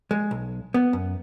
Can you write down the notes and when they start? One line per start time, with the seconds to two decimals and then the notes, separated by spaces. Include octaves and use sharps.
0.11 G#3
0.31 B1
0.74 B3
0.93 F#2